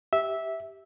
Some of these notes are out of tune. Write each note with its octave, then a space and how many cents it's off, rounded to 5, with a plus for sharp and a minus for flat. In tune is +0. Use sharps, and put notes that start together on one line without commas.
G4 +0 E5 -10